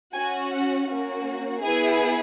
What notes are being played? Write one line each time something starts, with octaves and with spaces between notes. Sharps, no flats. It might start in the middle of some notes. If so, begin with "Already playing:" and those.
C#4 F#4 G#5
F#5
A#3 C#4 F#4
B3 E4 G#4 G#5